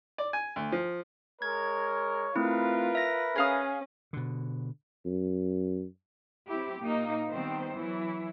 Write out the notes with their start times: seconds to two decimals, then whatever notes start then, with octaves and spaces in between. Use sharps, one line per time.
0.18 D5
0.33 G#5
0.56 D2
0.72 F3
1.42 G#3 A#4 C#5 G#6
2.36 A3 C4 E4 F4 A#4 B4
2.95 E5 A#6
3.36 C#4 G#4 F5 D#6
4.13 B2 D3
5.05 F#2
6.49 F#3 C4 E4 G4
6.81 A#2 A#3 D#4
7.30 D#3 G3 B3 C4 C5
7.77 E3 F#3 E4